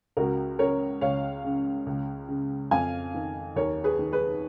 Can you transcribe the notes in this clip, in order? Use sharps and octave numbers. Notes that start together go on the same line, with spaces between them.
C#2 F#4 A#4
C#3 A#4 C#5
C#2 C#5 F5
C#3
C#2
C#3
F2 F5 G#5
D#3
D#2 A#4 C#5
G#4 B4
D#3
G#4 B4